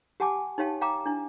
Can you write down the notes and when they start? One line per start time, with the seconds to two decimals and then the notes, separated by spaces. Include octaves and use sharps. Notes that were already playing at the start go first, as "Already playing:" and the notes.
0.20 G4 F#5 G#5 A5 D6
0.58 D#4 G4 C#5 F5 G5 A5
0.81 F5 G5 A#5 D6
1.06 D4 E4